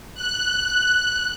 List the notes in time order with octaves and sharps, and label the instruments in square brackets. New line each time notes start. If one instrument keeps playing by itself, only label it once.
[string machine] F#6